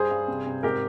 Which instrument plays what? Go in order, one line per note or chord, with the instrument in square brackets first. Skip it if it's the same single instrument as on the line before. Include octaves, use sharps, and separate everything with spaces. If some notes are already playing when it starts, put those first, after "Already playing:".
Already playing: [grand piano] G2 G#4 C5
G2
C3
C3
G#2 G4 A#4